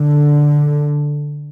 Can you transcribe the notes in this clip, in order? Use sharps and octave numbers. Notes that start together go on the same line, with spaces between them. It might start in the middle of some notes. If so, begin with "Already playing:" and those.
Already playing: D3